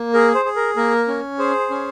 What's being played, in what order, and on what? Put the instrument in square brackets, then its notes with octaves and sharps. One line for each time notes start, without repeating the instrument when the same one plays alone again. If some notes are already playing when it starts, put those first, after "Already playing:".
Already playing: [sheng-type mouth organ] A#3
G#4 A#4
C5
G#4
A#4
A#3 A#4
C#4
G#4 C5
C#4